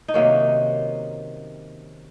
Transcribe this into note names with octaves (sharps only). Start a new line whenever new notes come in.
D#4
C3 D#3 F#3 A#3 C#4